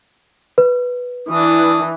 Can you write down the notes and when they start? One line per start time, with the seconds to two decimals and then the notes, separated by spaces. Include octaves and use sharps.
0.58 B4
1.29 E3 D4 D#6